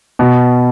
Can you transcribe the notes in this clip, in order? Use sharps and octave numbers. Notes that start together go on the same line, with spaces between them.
B2